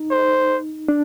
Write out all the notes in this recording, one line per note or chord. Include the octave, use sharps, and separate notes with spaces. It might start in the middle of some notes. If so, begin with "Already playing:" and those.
Already playing: D#4
C5
D4